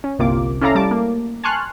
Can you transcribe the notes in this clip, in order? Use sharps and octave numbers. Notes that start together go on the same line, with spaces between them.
C#4
G1 C2 C3 A#3 F4 D6
C#4 E4 A4 D5 F5 A#5
G3 A3 A5 D6
A#3
G#5 A5 C6 C#6 F6 F#6